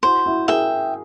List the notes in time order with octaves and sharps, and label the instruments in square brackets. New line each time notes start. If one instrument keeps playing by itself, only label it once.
[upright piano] E4 F#4 [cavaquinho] C5
[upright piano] E4 F#4
[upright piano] G#4 A#4 [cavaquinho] E5 G5